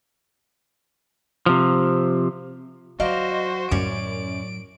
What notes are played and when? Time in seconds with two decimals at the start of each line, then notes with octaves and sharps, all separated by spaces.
1.46 C3 F3
3.00 F#3 F#4 C5 D5 D#5 F5 A#5
3.71 F#2 A2 F#3 C#5 D5 D7